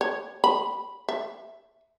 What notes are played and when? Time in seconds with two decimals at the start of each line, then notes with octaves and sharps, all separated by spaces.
0.01 C#5
0.44 B5
1.09 E5